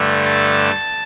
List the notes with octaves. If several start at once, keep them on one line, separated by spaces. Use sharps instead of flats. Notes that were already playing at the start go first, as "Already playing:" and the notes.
Already playing: G2 D3 A3
A5